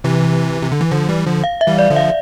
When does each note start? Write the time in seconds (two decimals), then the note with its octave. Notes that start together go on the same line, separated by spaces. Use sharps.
0.04 C3 E3
0.62 C3
0.72 D3
0.81 E3
0.91 D3 F3
1.09 E3 G3
1.26 D3 F3
1.44 F5
1.61 E5
1.67 E3 G3
1.79 D5
1.90 D3 F3
1.96 F5